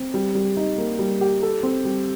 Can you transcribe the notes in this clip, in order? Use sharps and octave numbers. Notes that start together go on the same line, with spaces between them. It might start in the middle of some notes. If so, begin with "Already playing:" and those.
Already playing: C4
G3
G3
D#4
A#3
G3
G4
A4
C4
G3